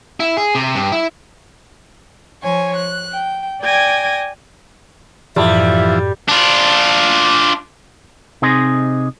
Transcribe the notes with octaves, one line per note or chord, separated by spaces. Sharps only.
E4
G#4
C3
G2
E4
F3 C#5 G#5
F#6
G5
D5 G5 G#5 G#6 A#6
F#2 A2 E3 F3 G3 E5
D4 F4
C3 C4 D#4 G#4 D#5 C6